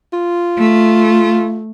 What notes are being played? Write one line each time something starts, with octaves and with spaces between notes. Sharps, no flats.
F4
A3